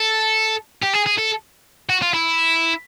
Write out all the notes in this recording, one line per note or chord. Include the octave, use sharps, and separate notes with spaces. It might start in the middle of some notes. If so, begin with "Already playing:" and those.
Already playing: A4
G4
G#4
G#4
A4
F#4
F4
E4